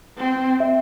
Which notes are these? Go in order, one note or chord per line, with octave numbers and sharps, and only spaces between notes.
C4
E5